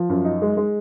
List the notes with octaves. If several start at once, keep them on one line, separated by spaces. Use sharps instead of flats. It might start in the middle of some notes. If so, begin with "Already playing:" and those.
Already playing: F3
F#2
D#4
G#3
G#3